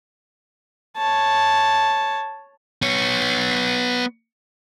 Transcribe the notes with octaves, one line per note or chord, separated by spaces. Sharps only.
C#5 A5
B3 C#5